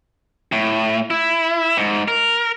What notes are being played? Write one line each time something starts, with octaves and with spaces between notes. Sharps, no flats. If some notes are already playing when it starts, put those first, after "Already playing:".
A2
E4
G#2
A#4